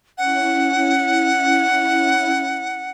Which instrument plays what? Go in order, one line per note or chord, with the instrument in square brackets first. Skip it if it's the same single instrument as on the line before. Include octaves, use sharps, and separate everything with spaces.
[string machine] C#4 E4 [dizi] F#5